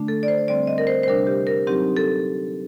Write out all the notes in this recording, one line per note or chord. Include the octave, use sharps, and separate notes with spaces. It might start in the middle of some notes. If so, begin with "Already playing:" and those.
Already playing: D3 A3 D4
A4
D5
C5
D3 G3 C4 D5
D#5
A#4
C5
C5
C3 G3 D4 A#4
G4
A#4
F#3 C4 D#4 G4
A4